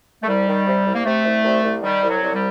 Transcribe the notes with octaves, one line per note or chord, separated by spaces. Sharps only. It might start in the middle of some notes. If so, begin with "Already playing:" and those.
A3
C2 G3
D#3
C3
C2
A#3
C3 A3
C2
C2
C2
D#3 G3
C2
F#3
C2
G3